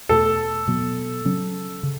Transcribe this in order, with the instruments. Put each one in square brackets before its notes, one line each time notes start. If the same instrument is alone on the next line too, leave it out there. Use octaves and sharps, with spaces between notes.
[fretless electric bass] E2 B2 A3 [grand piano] A4
[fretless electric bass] B2 F#3 B3
C#3 F#3 C#4
C#3